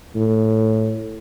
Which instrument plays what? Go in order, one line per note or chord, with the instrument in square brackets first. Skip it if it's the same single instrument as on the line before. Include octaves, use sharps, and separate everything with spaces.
[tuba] A2